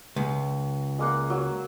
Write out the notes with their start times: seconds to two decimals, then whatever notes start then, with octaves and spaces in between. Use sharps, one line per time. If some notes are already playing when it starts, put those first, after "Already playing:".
0.16 C#2
0.99 G#3 A#3 F#5
1.30 F#3